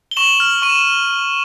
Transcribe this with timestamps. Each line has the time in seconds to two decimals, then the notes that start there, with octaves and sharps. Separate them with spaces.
0.11 G7
0.17 C#6 E7 F#7
0.40 F6
0.62 C#6 D#7
0.69 E7